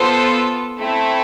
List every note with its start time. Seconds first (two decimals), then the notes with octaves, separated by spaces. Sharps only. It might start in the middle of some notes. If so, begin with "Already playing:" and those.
Already playing: B3 F4 A4 C5
0.77 A3 C4 E4 A4